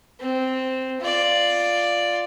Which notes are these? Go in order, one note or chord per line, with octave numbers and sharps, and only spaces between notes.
C4
F4 D5